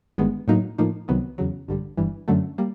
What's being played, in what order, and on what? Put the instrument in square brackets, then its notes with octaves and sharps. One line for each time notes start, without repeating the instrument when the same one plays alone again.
[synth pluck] G1 G2 D#3 G#3 B3
A2 F#3 A#3 D#4
A2 F3 A#3 D#4
C2 C3 D#3 F#3 B3
E2 C#3 F#3
A1 G2 D3 G3
G1 G2 E3 G3
F#2 D3 F#3 A3
G3 A#3